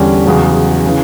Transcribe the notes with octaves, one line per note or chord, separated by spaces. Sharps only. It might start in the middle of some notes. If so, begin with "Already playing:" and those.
Already playing: E2 D3 G3 C#4 G4
E2 C#3 F#3 C#4
C#3 E3